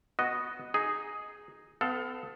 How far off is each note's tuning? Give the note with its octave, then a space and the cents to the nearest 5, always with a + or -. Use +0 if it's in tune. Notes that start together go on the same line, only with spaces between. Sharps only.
B3 +0 F#4 +0 D#5 +0
D#4 +0 G#4 +0
B3 +35 A4 +0 F5 +20